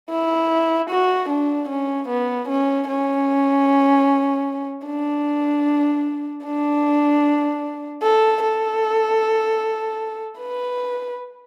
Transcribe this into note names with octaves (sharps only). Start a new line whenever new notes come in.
E4
F#4
D4
C#4
B3
C#4
C#4
D4
D4
A4
A4
B4